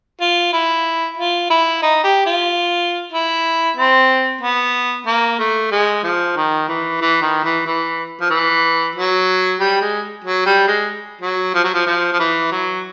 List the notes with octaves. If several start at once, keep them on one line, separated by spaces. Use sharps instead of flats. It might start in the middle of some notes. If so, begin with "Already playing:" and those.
F4
E4
F4
E4
D#4
G4
F4
E4
C4
B3
A#3
A3
G#3
F3
D#3
E3
E3
D#3
E3
E3
F3
E3
F#3
G3
G#3
F#3
G3
G#3
F#3
F3
F#3
F3
F3
F3
E3
F#3